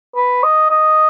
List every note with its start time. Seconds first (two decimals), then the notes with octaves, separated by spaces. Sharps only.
0.16 B4
0.43 D#5
0.71 D#5